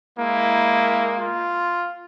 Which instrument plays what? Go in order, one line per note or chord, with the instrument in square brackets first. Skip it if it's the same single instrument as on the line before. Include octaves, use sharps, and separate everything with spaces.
[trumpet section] G#3 A#3 [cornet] E4
[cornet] F4